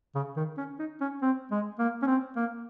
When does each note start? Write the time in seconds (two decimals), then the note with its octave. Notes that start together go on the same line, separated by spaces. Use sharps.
0.15 C#3
0.37 D#3
0.57 C#4
0.79 D#4
1.01 C#4
1.22 C4
1.51 G#3
1.79 A#3
2.02 C#4
2.07 C4
2.36 A#3